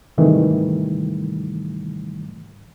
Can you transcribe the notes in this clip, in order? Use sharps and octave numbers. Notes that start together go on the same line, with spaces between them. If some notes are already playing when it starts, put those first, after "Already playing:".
G#2 C3 D#3 E3 G3 A3